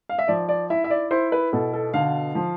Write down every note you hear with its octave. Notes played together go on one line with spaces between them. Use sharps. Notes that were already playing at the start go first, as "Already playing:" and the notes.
F5
E5
F3 D5
D5
E4 E5
E5
D5
E4 C5
B4
B2 A4
A4
D3 F5
F3